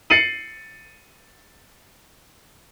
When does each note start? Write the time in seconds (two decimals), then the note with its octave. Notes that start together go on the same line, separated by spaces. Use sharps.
0.10 A6 C7 C#7 D#7 F#7